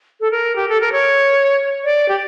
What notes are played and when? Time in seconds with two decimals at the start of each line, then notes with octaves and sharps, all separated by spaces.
0.20 A4
0.31 A#4
0.56 G4
0.69 A4
0.80 A#4
0.92 C#5
1.84 D5
2.09 G4